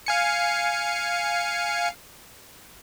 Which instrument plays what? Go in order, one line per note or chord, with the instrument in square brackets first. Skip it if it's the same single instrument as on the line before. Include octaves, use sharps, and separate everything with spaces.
[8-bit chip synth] F5 G#5 C#7